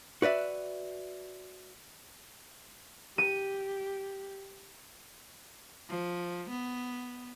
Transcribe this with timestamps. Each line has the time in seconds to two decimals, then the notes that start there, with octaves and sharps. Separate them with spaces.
0.22 F#4 B4 D5 E5
3.18 G4 D#7
5.89 F3
6.50 B3